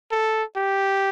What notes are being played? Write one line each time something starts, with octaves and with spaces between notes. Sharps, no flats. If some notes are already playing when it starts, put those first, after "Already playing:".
A4
G4